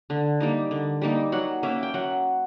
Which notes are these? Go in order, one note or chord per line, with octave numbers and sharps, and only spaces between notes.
D3
G3 A#3 D#4
D3
G3 A#3 D#4
F#3 F#5
A#3 C#4 E5
G5
F#3 F#5